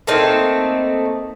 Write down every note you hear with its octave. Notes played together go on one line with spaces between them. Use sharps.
A3 A#3 C4 D#4